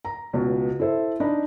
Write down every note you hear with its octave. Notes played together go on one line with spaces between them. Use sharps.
A#5
C#2 B2
E4 A4 C5 E5
D4 D#4 D#5 B5